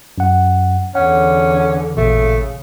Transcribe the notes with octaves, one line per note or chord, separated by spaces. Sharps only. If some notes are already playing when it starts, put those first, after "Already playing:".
F#2 F#5
E2 D3 C#4 F#5
A1 A#2 C#3 A3